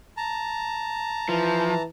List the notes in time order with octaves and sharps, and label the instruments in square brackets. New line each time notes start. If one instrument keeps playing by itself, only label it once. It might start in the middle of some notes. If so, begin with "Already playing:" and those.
[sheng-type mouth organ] A5 A#5
[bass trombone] E3 [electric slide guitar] F3